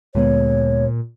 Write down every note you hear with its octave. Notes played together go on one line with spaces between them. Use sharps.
D2 A#2 G#3 B3 C#5